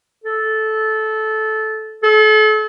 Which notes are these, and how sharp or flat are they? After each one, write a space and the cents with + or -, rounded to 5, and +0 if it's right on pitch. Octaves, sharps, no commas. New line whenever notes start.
A4 -15
A4 -35